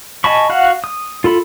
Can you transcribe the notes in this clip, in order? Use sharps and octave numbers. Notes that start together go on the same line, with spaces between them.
D#5 G#5 A5 B5 C#6
F#4 F5 F#5
D#6
F4 A4 B5